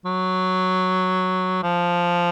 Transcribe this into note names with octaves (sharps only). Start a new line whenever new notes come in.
F#3
F3